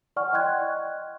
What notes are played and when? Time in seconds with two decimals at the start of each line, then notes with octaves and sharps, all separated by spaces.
0.16 D5 F#5 G#5 C#6 F6
0.33 D#5 G5 C6 F#6 G#6